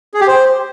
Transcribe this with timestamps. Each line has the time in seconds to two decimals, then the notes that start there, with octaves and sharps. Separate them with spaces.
0.14 G#4
0.21 G4
0.27 C5